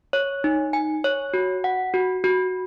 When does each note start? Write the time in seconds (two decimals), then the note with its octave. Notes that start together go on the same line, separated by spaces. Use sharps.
0.13 C#5
0.44 D#4
0.73 G#5
1.04 C#5
1.34 F#4
1.64 F#5
1.94 F#4
2.24 F#4